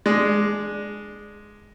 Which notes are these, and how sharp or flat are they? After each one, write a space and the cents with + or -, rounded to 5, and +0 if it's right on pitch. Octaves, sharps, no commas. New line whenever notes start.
G#3 +0 D4 +10